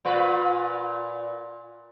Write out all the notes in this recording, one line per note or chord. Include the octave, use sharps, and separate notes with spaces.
A#2 F4 B4